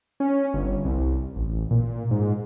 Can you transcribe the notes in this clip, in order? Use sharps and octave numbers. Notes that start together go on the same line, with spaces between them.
C#4
G1
C2
A1
A#2
G#2